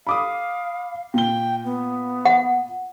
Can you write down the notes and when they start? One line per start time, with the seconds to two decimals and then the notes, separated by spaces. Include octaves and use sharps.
0.07 F5 B5 D6 D#6
1.14 A#2 G5 G7
1.65 B3
2.25 F#5